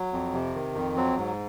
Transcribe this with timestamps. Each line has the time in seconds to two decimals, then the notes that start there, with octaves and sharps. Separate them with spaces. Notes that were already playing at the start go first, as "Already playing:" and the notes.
Already playing: F#3
0.12 F2
0.34 C3
0.54 D#3
0.75 F2
0.97 F#3 C4
1.17 G#2